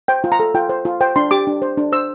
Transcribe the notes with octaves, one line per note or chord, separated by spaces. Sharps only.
C5 G5
F4
A#5
A4
F4 G5
C5
F4
C5 G5
D4 C6
G4 D6
D4
C5
D4
C5 E6